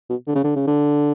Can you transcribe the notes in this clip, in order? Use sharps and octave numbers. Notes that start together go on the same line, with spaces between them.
B2
D3
C#3
D3
C#3
D3